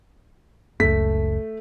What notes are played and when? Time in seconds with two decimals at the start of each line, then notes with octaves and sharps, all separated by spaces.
0.80 F#1 C#2 A3 B6